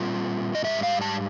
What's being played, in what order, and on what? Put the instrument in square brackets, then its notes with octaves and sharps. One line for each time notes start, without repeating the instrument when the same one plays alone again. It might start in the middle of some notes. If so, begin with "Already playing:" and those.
Already playing: [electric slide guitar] A#2 G3 C4 F4
D#5
G#2 D#3 G3 E5
F5
A5